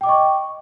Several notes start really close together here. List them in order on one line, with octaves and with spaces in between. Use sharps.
G5 D6 D#5 C#6